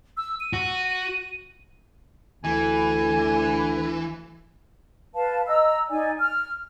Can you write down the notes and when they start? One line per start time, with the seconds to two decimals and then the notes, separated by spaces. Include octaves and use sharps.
0.17 E6
0.40 D#7
0.53 F#4
2.44 D2 E3 G#5
5.15 B4 F5 A5
5.47 D#5 A#5 E6
5.90 D#4 D5 G#5
6.19 F6